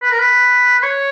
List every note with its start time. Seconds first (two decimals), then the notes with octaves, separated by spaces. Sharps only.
0.02 B4
0.11 A#4
0.19 B4
0.78 B4
0.83 C#5